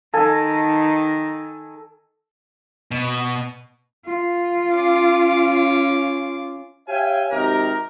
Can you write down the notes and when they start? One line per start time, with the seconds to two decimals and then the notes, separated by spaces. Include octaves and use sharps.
0.14 D#3 A4 G#5
2.91 B2
4.05 F4
4.71 C#4 D6
6.89 G4 C#5 E5 F5 G5 G#5
7.31 G#1 C3 D#4 G4 A#4